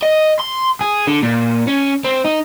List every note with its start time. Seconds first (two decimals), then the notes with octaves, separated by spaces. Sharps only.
0.02 D#5
0.39 C6
0.81 G#4
1.07 D3
1.23 A#2
1.68 C#4
2.05 C4
2.25 D#4